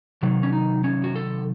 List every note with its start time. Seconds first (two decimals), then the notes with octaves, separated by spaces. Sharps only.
0.23 C3 D#3 F#3
0.43 C#4
0.53 D#4
0.84 C#4
1.04 F#4
1.16 A4